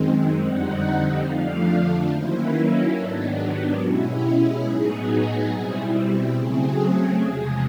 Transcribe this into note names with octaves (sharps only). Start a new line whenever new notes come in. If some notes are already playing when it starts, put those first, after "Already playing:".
Already playing: F#2 D#3 G#3 C4
F2 D3 G3 C4 D#4 F#5
F2 D3 F3 A3 D4 F5
D#3 F#3 A#3 C#4 E4 C5
B4
A#4
G#2 D#3 F#3 B3 D4 A4
G#4
G4
B2 G#3 C#4 E4 F#4
G4
G#4
A2 F#3 B3 D#4
B2 G3 C4 E4
C#3 F#3 A3 C4 G#4
E2 C3 F3 G#3